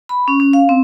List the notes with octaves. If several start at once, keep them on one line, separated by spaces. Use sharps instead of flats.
B5
C#4
C#4
F5
C4